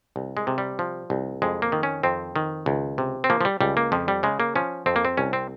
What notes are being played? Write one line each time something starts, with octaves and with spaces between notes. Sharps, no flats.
C2
G#3
C3
G3
F3
C2
F2 G#3
A#3
D#3
C#4
F2 C4
D#3
C#2
C3
C4
F3 A#3
F3
G3
C#2 G3
A#3
F2 F3
G3
C#3 G#3
A#3
F3 C#4
F2 C4
A#3
C4
C2 C#4
C4